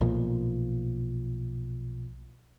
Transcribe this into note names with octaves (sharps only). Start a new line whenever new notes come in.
B1 A#2 F3